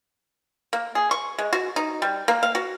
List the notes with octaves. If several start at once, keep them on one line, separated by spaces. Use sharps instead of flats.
A#3
G#4
C#6
G#3
F#4
D#4
G3
A#3
F5
F#4